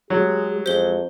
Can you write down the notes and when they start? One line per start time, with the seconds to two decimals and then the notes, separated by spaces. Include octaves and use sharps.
0.10 F#3 G#3 G4
0.66 F2 G#3 C5 G7